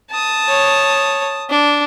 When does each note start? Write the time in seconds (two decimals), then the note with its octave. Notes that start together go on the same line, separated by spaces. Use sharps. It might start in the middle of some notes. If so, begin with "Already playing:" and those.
0.10 A5 D#6
0.48 C#5
1.50 D4